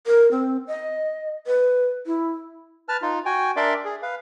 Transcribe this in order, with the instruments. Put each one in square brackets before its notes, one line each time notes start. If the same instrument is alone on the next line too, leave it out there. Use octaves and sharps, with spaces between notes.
[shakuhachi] A#4
C4
D#5
B4
E4
[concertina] B4 A5 F6
D#4 F4
F#4 G5 G#5
D4 A#4 D5 E5 C6 D6
G#4
B4 F5